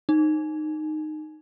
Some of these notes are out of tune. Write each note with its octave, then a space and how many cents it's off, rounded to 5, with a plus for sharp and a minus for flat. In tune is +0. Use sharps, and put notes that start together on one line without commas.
D#4 -15